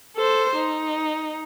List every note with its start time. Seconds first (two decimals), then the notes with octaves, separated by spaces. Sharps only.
0.16 A4 C5
0.56 D#4